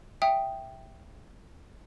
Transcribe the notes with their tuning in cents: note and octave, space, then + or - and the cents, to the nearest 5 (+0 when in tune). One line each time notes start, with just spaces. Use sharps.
E5 +0 G5 +0 D#6 +0